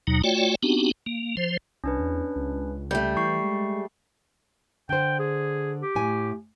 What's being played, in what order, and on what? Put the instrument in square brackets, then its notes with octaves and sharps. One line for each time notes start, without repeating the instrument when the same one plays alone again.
[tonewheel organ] D#2 B2 F#3 D#4
A3 F4 F#4 C#5 D5 G5
B3 C4 D4 D#4 F#4 G4
A#3
F3 C5
[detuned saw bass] C2 [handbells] C#4 D4 B4
[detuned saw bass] E2
C#2
[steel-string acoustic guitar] G3 A3 [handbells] G6
[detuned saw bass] E3 [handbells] C#6 C7
[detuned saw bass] G#3
[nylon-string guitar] D3 C5 [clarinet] G5
[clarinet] G#4
G4
[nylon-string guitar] A2 G#5